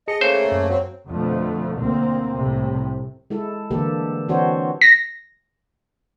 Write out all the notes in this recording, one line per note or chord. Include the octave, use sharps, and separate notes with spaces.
G#4 D#5 A5 C#7
C#3 A3 A#3 C5
F#2
F#3 C4
F2 B2 D3 F3 A3
D2 A#3 C4
C2 A2 C3
G#3 E4 A4
D3 E3 A#3 G4 A4
E3 C4 D4 F#4 C5 C#5
A#6